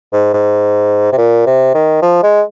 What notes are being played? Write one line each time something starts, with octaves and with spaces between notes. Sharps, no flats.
G#2
G#2
C3
A#2
C3
D#3
F3
G#3